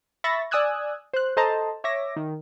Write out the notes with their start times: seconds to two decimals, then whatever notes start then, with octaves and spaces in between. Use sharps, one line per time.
0.24 E5 B5 C#6 A6 A#6
0.51 D5 G#5 D#6 E6 F#6 G#6
1.14 C5 F#6
1.37 A4 C5 D#5 A5 A#5
1.84 C#5 E5 D6 A#6
2.16 D#3